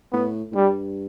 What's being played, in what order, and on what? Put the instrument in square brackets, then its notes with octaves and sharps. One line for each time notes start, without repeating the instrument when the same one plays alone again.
[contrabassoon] A2 [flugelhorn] B3
[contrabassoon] A2
[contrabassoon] G2 [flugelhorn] G3